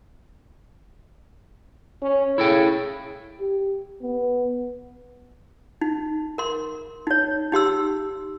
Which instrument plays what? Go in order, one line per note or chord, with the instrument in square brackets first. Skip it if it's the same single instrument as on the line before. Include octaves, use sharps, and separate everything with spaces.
[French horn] C#4
[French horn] C#3 [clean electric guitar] E4 A4 G5
[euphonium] G4
B3
[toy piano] D#4
A#4 C6
D#4 C#5
D#4 G4 C6 E6